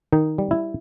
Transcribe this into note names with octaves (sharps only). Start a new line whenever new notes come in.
D#3 D#4
G3
E4